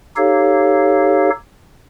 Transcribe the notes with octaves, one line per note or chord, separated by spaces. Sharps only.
D#4 G4 A4 C#5 F5